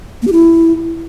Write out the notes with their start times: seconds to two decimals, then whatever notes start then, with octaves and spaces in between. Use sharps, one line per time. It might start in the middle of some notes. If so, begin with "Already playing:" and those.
0.22 A#3
0.27 G4
0.32 E4